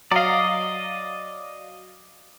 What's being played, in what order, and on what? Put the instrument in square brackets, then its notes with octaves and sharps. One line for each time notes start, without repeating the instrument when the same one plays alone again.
[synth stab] F#3 F5 [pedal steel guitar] D5 D#5